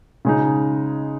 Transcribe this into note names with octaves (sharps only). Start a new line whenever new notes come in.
C#3 G#3 D#4